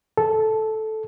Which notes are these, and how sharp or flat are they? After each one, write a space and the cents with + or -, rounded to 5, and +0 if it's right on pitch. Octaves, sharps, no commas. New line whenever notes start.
A4 -10